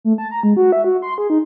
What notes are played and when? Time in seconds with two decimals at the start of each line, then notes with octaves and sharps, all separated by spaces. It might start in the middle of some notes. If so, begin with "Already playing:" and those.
0.04 A3
0.18 A5
0.31 A#5
0.43 G#3
0.57 F#4
0.72 E5
0.84 F#4
1.02 C6
1.18 G#4
1.30 D#4